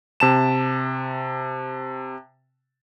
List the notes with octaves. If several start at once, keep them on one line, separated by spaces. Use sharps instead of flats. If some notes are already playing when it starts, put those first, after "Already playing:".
C3 A5 E7